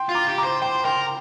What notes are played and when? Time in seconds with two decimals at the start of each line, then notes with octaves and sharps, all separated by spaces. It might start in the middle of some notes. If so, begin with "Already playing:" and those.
Already playing: G5 C6
0.09 F4
0.15 A#5 D6
0.27 G4
0.38 A#5 D6
0.44 C5
0.62 C5 G5 C6
0.85 A#4 G5 C6